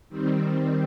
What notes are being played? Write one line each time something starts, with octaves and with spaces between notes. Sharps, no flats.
D#3 G3 C4